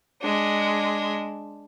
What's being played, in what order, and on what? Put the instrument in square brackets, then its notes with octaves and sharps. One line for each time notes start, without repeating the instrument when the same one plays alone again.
[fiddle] G#3 D4